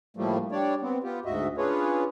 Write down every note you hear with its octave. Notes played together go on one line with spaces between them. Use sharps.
A2 F3 G3 A3 A#3
G3 D4 C#5 D5
B3 C4
B3 F4 G4
D2 G#2 F#4 D#5 E5
C#4 D4 F4 G#4 B4 C#5